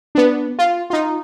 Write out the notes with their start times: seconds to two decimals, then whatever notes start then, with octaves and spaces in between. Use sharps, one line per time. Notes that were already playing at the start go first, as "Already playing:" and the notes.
0.15 B3 D4
0.59 F4
0.90 D#4 F4